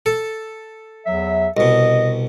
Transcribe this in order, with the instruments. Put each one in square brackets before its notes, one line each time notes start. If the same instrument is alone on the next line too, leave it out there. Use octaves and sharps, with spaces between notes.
[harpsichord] A4
[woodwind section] E2 F#3 E5
[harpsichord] C2 B2 [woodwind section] D#5